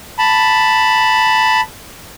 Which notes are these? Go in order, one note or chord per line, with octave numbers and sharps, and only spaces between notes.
A5 B5